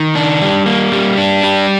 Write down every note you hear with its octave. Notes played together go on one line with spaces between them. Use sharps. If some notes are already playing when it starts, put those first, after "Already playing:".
Already playing: D#3
D4
G3
A#3
G3
D4
G3